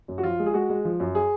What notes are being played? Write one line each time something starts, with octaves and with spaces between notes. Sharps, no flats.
F#2
F#4
F3 F4
G#3
G#4
G#3 F#4
G#3
F3
F#2
G#4